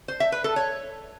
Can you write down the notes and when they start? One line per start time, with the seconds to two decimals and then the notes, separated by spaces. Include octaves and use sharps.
0.08 C5
0.20 E5
0.32 B4
0.44 A4
0.56 C#5